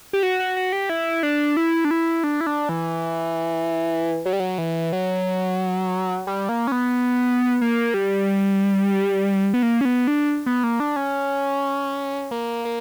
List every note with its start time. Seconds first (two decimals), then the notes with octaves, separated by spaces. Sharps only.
0.13 G4
0.23 F#4
0.39 F#4
0.56 F#4
0.72 G4
0.89 E4
1.23 D4
1.57 E4
1.85 D4
1.91 E4
2.24 D4
2.41 E4
2.47 D4
2.69 E3
4.26 F#3
4.33 G3
4.40 F#3
4.58 E3
4.93 F#3
6.27 G3
6.49 A#3
6.67 C#4
6.72 B3
7.61 A#3
7.94 G3
9.54 B3
9.63 A#3
9.81 C#4
9.85 B3
10.07 D4
10.46 B3
10.64 A#3
10.80 D4
10.96 C#4
12.31 A#3
12.65 A#3